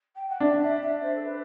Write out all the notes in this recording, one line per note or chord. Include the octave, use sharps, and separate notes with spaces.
G5
F#5
D4 E5
E5
E5
C5
A4
B4